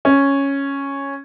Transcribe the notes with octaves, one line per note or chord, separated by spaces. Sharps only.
C#4